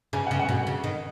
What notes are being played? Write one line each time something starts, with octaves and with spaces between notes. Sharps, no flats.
C#3 G#5
F#5
C#3
F#5
B2
C#3
D#3